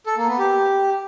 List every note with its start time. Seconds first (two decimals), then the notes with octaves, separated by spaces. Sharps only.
0.06 A4
0.17 A#3
0.28 B3
0.38 G4